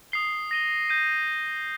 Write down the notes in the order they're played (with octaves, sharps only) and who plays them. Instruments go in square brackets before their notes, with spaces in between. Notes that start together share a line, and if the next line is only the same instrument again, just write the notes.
[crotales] D#6 C7 G7
A#6 D#7 G7
G6 A#6 D#7